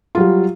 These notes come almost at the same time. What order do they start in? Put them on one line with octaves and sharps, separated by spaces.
F4 F#3 G3